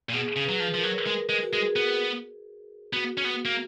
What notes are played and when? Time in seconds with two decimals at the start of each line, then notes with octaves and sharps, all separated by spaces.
0.09 A#2
0.13 B2 G#4
0.36 C#3
0.44 B4
0.49 F#3
0.60 F3
0.74 F3 A#4
0.83 F#3
1.06 G#3 A#4
1.29 G#3
1.43 F#4
1.53 G#3 G#4
1.76 B3
2.93 B3 F#4
3.18 C#4
3.25 B3
3.45 A#3